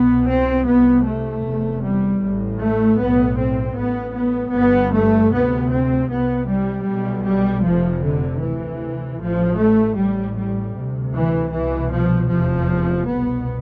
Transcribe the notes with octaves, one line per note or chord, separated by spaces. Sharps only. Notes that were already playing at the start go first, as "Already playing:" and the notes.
Already playing: C2 B2 B3
C4
C2 C3 B3
A3
F1 E2 C3
G3
A1 A2
A3
B1 A2 B3
C4
A1 A2 B3
B3
G1 G2 B3
A3
D2 C3 B3
C4
C2 C3 B3
G3
B1 B2 G3
G3
F1 F2 C3 F3
D3
D2 C3 E3
A1 A2 F3
A3
A1 A2 G3
G3
D2 C3
E3
C2 B2 E3
F3
F1 E2 C3 F3
C2 B2 B3